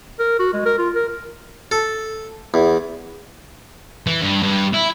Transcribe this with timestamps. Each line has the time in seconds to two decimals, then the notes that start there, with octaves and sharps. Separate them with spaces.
0.19 A#4
0.39 F#4
0.53 G#3
0.65 A#4
0.78 F4
0.95 A#4
1.71 A4
2.54 E2
4.07 E3
4.21 G2
4.43 G2
4.73 E4